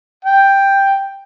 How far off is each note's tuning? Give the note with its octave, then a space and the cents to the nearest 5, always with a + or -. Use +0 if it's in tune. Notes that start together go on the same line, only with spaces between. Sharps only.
G5 +5